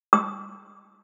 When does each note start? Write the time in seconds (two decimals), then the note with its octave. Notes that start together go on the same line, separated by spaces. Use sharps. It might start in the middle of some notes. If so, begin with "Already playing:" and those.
0.13 D#6